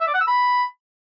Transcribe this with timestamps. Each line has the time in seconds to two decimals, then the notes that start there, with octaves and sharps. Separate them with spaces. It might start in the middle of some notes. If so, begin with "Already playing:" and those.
0.01 E5
0.08 D5
0.14 F#5
0.21 E6
0.27 B5